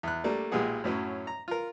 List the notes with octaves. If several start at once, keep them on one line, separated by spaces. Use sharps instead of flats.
E2 F#6
G3 A3 A#3 D4
B1 A#2 G#3 G4 G#4 F#5
F#2 A2 F#3 C#4
A#5
F4 A#4